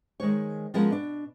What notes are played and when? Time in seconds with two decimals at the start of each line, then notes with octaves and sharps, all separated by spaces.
0.20 D#3 G#3 C5 C#5
0.74 F3 G#3 B3 C#4 F4 A#4
0.90 B2 D4